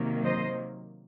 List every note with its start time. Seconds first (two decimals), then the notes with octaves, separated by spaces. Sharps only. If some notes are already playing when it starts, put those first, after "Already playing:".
Already playing: C3 D#3 F#3 A#3
0.25 C5 D#5